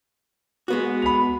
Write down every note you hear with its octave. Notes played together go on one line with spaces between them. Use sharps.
G#3 B3 F#4
B5 F7